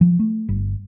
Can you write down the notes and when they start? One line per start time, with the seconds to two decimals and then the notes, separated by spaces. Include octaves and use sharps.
0.01 F3
0.19 A3
0.49 G1